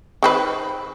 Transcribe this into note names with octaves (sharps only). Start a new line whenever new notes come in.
D#3 C4 B4